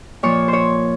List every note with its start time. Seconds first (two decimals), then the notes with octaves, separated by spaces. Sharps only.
0.23 A#2 F3 C#5
0.48 C5
0.53 C#5